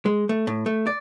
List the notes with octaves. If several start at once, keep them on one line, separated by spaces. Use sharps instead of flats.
G#3
A3
A2
A3
D5